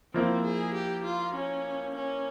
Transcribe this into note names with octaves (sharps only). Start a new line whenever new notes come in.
F3 A#3 C4 E4
G#4
G4
F4
C#4
C#4